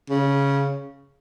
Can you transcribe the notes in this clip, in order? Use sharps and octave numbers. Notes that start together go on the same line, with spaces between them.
C#3